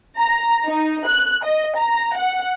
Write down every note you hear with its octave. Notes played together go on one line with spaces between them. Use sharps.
A#5
D#4
F#6
D#5
A#5
F#5